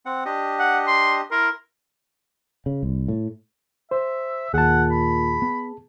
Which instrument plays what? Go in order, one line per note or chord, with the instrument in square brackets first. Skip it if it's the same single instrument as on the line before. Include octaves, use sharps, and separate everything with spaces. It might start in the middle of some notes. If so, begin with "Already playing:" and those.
[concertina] C4 F#5
D4 G4 D#5
[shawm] F#5
C6
[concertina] E4 C6 [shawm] A#4
[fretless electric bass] C#3
C2
A2
[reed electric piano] C5 [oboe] E5
[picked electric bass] D#2 [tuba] A#2 [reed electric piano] G#4 A5 [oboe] F#5
[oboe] B5
[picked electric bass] B3